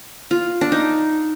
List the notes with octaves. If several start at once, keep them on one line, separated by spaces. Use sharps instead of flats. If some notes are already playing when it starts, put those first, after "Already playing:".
F4
D4
D#4